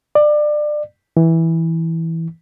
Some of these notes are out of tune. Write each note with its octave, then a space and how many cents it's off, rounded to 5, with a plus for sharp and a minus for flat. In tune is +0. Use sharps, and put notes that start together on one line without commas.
D5 +25
E3 -10